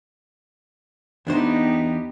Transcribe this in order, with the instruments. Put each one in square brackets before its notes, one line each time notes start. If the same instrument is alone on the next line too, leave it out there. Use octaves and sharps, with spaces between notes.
[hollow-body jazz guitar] E2 D4 C5 [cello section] B3 D#4 G4